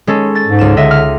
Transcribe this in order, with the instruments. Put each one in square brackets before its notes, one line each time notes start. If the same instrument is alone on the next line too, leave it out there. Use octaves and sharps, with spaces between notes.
[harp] G#3 C#4 A4
A6
[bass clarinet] G#2
[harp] C#2 E7
[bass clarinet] D3 [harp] D#5 E5
[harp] F6